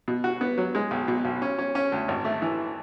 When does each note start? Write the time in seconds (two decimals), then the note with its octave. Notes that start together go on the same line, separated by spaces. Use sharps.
0.08 B2
0.24 F#4
0.41 B3
0.58 F#3
0.75 G#3
0.91 B1
1.08 B2
1.25 B1
1.42 C#4
1.58 C#4
1.75 C#4
1.92 D2
2.08 G#1
2.25 A3
2.42 E3